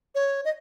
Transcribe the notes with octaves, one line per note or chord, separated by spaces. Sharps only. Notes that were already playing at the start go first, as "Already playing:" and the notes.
C#5
D#5